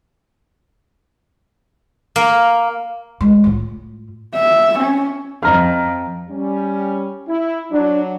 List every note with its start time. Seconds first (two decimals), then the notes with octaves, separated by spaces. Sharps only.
2.16 A#3
3.21 G#3
3.44 A2 F4
4.35 E5
4.79 C#4
5.43 F2 D#5 A#5 F6
6.29 G3 C#4
7.28 E4
7.72 F#3 D4